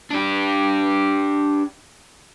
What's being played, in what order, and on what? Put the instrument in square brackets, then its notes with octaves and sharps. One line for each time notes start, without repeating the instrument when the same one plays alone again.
[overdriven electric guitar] D4 G4